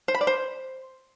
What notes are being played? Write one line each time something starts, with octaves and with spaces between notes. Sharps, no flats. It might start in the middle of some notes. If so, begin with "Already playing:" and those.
C5
B5
D5
C5